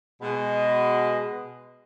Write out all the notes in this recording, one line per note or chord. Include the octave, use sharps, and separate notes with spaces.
B2 G#3